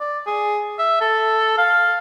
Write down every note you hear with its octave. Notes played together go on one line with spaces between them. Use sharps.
D5
G#4
E5
A4
F5